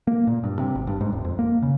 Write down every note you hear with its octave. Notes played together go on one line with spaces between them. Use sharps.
A#3
A#2
G2
C3
G#1
G2
G#2
D#1
F2
A#3
C#3